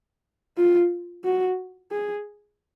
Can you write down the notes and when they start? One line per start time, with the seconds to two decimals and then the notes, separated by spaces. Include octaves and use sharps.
0.57 F4
1.24 F#4
1.92 G#4